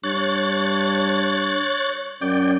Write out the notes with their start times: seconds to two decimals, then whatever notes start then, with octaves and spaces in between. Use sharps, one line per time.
0.03 G2 C#5 F#6 A6
2.21 F#2 D5 G5